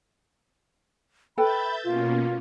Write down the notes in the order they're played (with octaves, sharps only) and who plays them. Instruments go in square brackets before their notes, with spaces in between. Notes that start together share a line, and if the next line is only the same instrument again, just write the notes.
[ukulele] A4 B4 G5 [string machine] E5 G6 A6 [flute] B5
[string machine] B2 A#3 C#4 [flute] F4